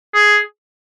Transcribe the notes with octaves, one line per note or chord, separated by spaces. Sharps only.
G#4